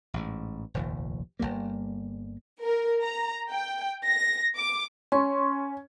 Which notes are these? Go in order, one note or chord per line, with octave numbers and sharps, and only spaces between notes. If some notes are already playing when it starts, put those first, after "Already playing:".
A1 G#2
F1 A#1 D#2 F3
G1 D#2 G3 A#3
A#4
A#5
G5
A#6
D6
C#4 C6 C#6